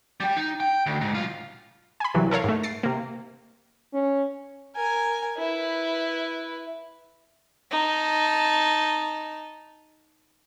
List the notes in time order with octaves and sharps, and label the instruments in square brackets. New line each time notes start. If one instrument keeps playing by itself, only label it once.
[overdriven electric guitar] G3 G5
D#4
G5
D2
G#2
B1 F4
[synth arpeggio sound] G#5 B5
C2 C3 E3 F#3
A4 A#4 C#5 F5
G#2 A3
A6 C7 D7
C3 A#3
[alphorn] C#4
[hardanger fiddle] A#4 G#5
E4 B4
D#4 A5